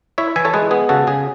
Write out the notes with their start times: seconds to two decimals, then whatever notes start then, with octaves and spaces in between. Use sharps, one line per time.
0.18 E4 C#5 E5
0.36 E3 E5 G#5
0.45 A4 C#5
0.53 G#3 G#4 B4
0.71 B3 G#4
0.89 C#3 F#4 A4
1.07 C#3 G#4